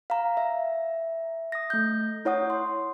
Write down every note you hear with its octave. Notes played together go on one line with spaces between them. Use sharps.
F5 A#5
E5
D#6 A#6
A3 G6
E4 C#5 F#5 D#6
C6